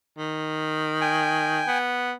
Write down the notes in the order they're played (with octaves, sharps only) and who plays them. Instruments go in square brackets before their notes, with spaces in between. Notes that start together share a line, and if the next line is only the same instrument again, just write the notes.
[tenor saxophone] D#3
[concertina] G5 G#5
[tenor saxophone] B3